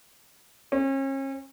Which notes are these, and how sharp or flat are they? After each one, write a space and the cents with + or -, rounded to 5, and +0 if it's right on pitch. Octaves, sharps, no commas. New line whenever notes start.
C#4 -40